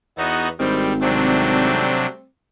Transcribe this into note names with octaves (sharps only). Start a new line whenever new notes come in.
E2 B3 D#4 F#4
G#1 G2 D#3 G3 C4
C3 F#3 G3 A3 C4 D4